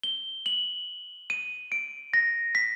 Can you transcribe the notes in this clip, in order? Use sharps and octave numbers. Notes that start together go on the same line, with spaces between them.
G7
F#7
D#7
D7
A#6
B6